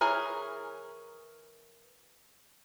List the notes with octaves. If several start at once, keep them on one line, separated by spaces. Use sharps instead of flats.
E3 G#4 A#4 C#5